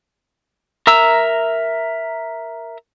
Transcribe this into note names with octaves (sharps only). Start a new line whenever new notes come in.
A#4 E5 A#5 E6